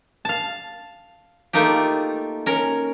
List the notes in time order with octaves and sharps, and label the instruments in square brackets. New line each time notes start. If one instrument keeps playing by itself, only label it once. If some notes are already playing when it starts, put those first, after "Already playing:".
[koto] F5 A5
A3 A#3 D#4 F4 G4
C#4 A#4